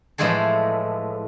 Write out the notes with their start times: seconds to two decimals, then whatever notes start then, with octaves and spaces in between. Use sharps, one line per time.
0.18 A2 E3 F3 G#3 G#4 A4